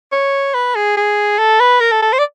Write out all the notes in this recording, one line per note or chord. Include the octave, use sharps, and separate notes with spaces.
C#5
B4
G#4
G#4
A4
B4
A#4
A4
A4
C5
D5